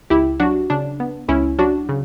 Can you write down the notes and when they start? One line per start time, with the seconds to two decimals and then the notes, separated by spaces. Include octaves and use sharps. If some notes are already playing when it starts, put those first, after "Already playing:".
0.10 C#2 E4 G4
0.40 F#3 D4 F#4
0.70 C#3 D4
1.00 B3
1.28 C#2 C#4 E4
1.59 F#3 D4 F#4
1.89 C#3